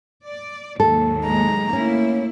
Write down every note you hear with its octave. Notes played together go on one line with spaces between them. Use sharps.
D5
D#2 G#2 F#3 A4
G#3 A#5
A3 A#3 C#4 E4